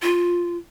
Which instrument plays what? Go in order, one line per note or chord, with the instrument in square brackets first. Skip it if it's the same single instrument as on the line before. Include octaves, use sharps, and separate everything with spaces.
[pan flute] F4